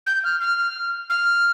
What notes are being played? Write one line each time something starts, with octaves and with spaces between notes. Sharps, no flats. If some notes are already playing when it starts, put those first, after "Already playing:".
G6
F6
F6
F6